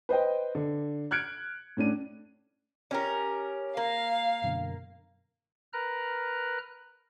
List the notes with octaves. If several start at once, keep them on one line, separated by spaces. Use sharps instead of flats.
B4 C5 D#5 G5
D3
F6 F#6 G#6 C#7 D7
A2 C#4 D4 D#7
C#4 G4 A#4
A#3 F5
F#2 B2 D3
A#4 B4 A#5 F6 F#6